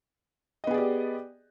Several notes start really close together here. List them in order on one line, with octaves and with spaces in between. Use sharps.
D#5 B3 G#4 D5 G4